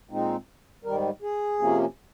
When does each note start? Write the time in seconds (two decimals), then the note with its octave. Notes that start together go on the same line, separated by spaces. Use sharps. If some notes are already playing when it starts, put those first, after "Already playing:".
0.09 A#2 G#3 C4 D#4
0.84 G#2 D#3 G3 A#4
1.22 G#4
1.59 C3 F3 A#3 C#4